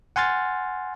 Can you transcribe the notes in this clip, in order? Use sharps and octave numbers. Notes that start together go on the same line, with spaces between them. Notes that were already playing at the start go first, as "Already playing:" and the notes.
F#5 G#5 C6 F6 A6